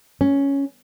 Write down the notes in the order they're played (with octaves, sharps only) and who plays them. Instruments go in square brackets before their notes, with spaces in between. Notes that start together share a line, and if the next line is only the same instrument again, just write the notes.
[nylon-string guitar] C#4